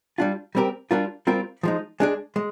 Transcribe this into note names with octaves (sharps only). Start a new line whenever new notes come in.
G3 D4 F4
G3 C4 G4 A#4
G3 D4 F4 A#4
G3 C4 F4 A#4
F3 G#3 D#4
G#3 D4 G#4
G#3